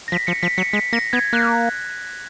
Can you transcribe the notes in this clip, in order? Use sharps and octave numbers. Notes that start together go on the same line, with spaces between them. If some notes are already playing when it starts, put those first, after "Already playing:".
A#6
F3 B6
F3 C#7
F3 B6
F#3 C#7
G#3 B6
A#3 A#6
B3 G#6
A#3 F#6